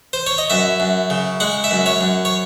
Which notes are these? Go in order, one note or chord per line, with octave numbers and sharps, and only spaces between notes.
C5
C#5
D#5
F#2 E5
F#2
C#3
G#3 F#5
E5
F#2
C#5
F#2
C#5